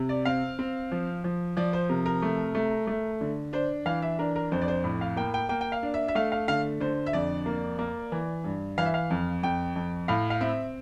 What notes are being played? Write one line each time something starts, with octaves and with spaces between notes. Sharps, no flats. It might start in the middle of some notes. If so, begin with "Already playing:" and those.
Already playing: C3
D5
C4 F5
C4
F3
F3
F3 D5
C5
C3 A#4
A#4
A3
A3
A3
D3
D4 C5
E3 F5
E5
D4 A#4
A#4
F2 C5
D5
C5
A2
F5
A#3 G5
G5
A#3 G5
G5
F5
D4
E5
E5
A3 F5
F5
D3 F5
D3 C5
E5
F2 D5
A#3
A#3
E3
G2
E3 F5
E5
F5
F2
F2 G5
F2
A2 F5
F5
C4 E5